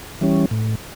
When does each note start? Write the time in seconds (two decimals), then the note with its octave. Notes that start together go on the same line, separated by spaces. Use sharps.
0.21 E3 G3 C#4
0.51 A2